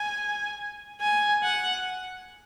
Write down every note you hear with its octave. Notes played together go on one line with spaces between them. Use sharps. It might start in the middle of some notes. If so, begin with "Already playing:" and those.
Already playing: G#5
G#5
F#5